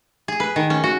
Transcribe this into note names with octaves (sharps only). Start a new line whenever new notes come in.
G#4
B4
D#3
C#4
F#4